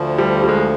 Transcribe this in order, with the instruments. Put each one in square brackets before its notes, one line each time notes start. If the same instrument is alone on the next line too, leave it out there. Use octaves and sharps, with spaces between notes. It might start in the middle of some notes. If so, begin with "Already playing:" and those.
Already playing: [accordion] D2 D3 F3
[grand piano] G3
G3
G#3